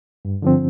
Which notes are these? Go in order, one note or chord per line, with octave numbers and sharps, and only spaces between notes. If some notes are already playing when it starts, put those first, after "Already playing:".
G2
D3 F3 C4